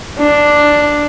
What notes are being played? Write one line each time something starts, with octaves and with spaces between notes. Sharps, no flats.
D4